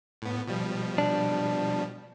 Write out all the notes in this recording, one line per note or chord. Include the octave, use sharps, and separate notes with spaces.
A2 B3
B2 F3 G3
D4